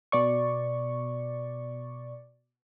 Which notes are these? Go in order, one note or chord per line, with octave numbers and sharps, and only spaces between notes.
B2 D5 C#6